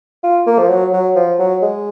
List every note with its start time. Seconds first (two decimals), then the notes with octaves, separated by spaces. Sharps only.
0.23 F4
0.47 A#3
0.58 F3
0.69 F#3
0.93 F#3
1.16 F3
1.39 F#3
1.62 G#3